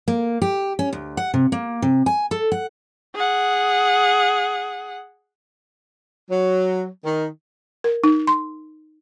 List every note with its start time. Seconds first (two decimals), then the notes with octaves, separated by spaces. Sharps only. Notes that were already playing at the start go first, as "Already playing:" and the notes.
0.08 A#3
0.42 G4
0.79 C#4
0.93 D2
1.17 F#5
1.34 C3
1.52 A#3
1.82 C3
2.06 G#5
2.31 A4
2.52 F#5
3.14 G#4 F#5
6.30 F#3
7.05 D#3
7.84 A#4
8.04 D#4
8.27 C6